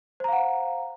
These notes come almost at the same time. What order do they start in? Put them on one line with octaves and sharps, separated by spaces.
C5 A#5 F5 F#5